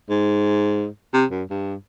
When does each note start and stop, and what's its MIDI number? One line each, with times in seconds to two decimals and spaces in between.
0.10 0.87 44
1.14 1.25 48
1.31 1.43 42
1.50 1.75 43